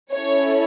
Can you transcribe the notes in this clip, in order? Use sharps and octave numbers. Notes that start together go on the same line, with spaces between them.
C#4 E4 A4 C#5